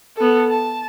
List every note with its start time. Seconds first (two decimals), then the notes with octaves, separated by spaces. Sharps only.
0.17 B3 A4
0.50 A5